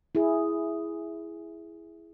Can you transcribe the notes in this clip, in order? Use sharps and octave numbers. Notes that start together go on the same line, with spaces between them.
E4 G#4